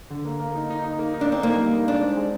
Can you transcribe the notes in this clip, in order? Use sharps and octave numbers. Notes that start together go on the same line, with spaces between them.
D3
A#3
A#3
D#4
D#4
D#4
A#3
D#4
D4
C4 D#4
A#3 D#4
G3
D#4
G#3 D4
C4
G#3